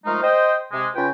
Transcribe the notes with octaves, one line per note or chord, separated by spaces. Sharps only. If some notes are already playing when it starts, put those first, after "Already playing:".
F3 G#3 A3 D#4 A#4 F5
C5 D#5 G5
C3 G#3
C#3 F4 B4 G5